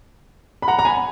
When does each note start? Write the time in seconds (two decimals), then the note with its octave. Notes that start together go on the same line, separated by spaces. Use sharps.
0.62 B5
0.68 F#5 A#5
0.79 A#5
0.85 G#5 B5